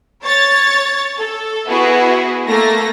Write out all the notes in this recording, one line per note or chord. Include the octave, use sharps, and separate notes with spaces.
C#5 A6
A4
B3 E4 F#4 G#4
A3 A#3 A#6